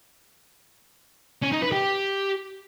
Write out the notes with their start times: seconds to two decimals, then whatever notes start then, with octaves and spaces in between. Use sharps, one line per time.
1.42 C#4
1.52 D#4
1.62 B4
1.72 G4